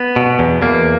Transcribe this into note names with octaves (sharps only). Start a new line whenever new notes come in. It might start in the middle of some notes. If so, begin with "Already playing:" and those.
Already playing: B3
B2
E2
E2 A#3